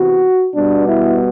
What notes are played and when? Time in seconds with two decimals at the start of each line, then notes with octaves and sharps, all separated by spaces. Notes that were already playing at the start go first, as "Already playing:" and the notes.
Already playing: C3 E3 B3 F#4
0.55 B2 G3 B3 D4
0.88 E4